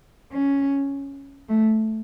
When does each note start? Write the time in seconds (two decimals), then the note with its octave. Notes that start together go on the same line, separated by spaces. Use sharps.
0.32 C#4
1.49 A3